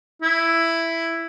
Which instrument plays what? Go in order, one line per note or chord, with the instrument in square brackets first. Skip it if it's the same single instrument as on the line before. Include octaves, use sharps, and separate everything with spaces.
[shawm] E4